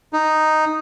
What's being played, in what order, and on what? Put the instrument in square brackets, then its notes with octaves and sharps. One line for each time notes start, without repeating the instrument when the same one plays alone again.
[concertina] D#4